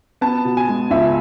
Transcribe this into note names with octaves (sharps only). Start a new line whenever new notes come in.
B3 A5
B2
G#5
G#3
C#2 E5